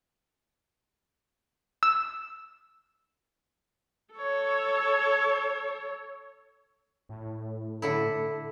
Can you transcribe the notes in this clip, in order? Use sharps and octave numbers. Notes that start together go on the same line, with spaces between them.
E6
A4 C#5
A2
D3 E4 A4